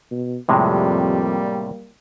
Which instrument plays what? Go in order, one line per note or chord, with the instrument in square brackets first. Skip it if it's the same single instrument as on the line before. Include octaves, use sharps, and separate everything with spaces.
[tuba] B2
[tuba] F2 [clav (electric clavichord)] A2 C3 G#3 [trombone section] G3 A#3